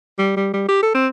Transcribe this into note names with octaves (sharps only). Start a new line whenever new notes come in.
G3
G3
G3
G4
A4
C4